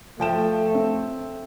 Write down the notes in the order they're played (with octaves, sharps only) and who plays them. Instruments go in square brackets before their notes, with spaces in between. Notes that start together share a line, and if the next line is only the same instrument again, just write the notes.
[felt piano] F3 G5 E7 [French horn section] A3
[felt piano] C4